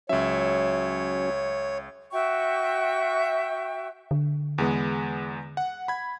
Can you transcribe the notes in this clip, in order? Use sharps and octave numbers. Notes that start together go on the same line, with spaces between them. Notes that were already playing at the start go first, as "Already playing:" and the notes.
C#2 F#3 C#4 C#5 E5
F#4 E5 G5 C#6
D3
E2 G#3 B3
F#5
B5 G#6